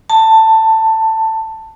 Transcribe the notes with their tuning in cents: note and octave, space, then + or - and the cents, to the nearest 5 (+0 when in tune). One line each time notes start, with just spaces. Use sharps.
A5 +15